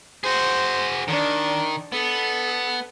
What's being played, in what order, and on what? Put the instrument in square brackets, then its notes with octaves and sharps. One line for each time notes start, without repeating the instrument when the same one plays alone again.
[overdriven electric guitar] F#4 G#4 [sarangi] C5
[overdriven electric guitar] D#3 [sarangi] D4
[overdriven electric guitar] B3 [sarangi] A4